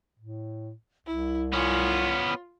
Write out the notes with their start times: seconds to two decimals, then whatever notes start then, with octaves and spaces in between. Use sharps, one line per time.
0.19 A2
1.07 C2 E4
1.53 B3 C#4 F4